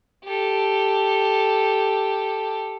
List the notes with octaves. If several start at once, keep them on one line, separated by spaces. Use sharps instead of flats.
G4 A4